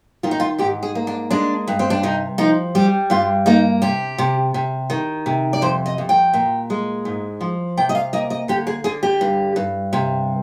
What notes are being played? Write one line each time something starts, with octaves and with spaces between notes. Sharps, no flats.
D#3 F4
D#4
F4
G#2 G4
G#4
A#3
D4
G#3 D4
G2
C4
D4
C3 D#4
F3 D#4
G3 G4
G2 F4
A#3 D#4
C3 G4
C3
C3
D#3
C3
D5
F2 C5
D#5
F2
G5
A#2
G#3
G#2
F3
C3 G5
D#5
F5
A#3 D#5
D#5
D3 G4
G#4
D3 G#4
G4
G2
G2
C3